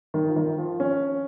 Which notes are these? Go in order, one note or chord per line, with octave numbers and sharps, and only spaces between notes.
D#3
F3
D#3
F3
C#4